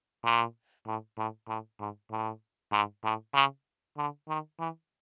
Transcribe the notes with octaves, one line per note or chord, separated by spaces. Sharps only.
A#2
A2
A2
A2
G#2
A2
G#2
A2
C#3
D3
D#3
E3